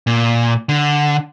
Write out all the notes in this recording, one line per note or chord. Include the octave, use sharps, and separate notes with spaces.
A#2
D3